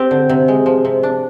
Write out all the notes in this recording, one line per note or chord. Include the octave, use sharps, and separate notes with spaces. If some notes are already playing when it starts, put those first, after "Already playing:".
Already playing: C4 G4
D3
C3
G#3
F3
C3
D4